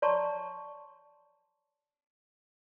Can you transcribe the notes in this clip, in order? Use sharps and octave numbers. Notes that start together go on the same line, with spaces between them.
C#5 D5 A5 A#5 C6 C#6